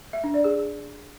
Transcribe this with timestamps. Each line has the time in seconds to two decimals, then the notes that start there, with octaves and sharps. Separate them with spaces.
0.13 E5
0.24 D4
0.34 D5
0.44 G#4